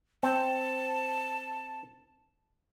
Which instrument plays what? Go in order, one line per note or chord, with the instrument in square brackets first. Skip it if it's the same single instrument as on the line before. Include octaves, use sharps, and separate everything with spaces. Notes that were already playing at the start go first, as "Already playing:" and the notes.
[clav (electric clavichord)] C4 [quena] A5